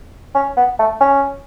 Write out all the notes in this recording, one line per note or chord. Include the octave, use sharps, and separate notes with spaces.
C#4
B3
A3
C#4